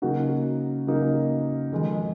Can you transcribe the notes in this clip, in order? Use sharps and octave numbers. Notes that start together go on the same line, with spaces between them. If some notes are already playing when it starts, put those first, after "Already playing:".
C#3 F#3 A#3 D#4 F#4 F#5
C#3 F#3 A#3 D#4
F2 D#3 G#3